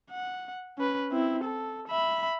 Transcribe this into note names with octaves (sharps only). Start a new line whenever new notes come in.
F#5
C#4 B4
C4 E4
A4
E5 B5